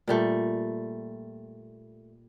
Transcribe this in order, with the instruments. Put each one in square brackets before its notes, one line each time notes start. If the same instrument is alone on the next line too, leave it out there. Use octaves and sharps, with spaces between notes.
[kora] A#2 G3 A3